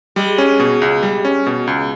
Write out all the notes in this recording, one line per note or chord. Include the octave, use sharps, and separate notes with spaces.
G3 G#3
C#4
B2
C#2
G3
C#4
B2
C#2